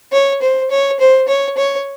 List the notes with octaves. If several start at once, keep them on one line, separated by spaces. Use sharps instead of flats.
C#5
C5
C#5
C5
C#5
C#5